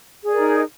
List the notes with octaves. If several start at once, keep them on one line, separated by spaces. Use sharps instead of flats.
D#4 G#4 A#4 D5